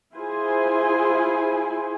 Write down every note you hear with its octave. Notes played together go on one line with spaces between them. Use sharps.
E4 F4 G#4 C5 G#5